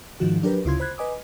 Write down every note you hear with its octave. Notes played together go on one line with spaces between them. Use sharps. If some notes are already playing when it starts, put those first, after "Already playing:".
G#2 D#3 F3 F#4
F#3 D4 G4 A#4 B4
D2 C#3 E4 F4 C6 G#6
C5 B5 F#6 G#6
B4 D#5 G#5 D6 D#6